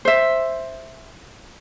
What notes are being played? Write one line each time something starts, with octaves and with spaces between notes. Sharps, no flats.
C5 E5